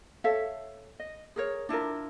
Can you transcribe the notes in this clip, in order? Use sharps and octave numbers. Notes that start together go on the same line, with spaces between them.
A4 C#5 E5 F5
D#5
G#4 A#4 C#5
D4 E4 F4 A#4